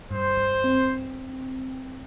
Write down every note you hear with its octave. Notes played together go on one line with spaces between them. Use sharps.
G2 C5
G2
C4